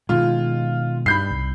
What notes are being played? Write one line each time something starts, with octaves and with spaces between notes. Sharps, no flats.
B2 D#3 G#3 F4
G2 B5 G6 C7
C2